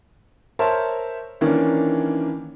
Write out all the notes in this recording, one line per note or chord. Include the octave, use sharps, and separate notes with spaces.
A#4 C5 C#5 E5 A5
D#3 E3 A#3 C#4 D4